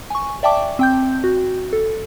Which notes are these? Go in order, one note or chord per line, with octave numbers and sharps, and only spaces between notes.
G#5 C#6
D5 E5 G5 A5 D6
C4 G5 G6
F#4
A4